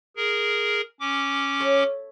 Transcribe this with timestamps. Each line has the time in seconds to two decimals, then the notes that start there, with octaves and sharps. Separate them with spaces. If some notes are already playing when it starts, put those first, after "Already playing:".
0.16 G#4 A#4
1.00 C#4 D6
1.60 A4 C#5 E5